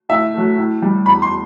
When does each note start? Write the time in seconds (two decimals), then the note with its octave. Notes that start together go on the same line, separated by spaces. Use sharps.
0.09 A2 E5
0.34 F#3 A3
0.58 A2
0.82 G3
1.06 E2 B5
1.22 C6